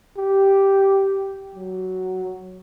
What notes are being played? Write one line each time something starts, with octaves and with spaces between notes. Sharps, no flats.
G4
F#3